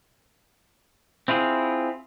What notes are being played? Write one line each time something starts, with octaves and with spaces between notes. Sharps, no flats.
C4 E4 F4 G#4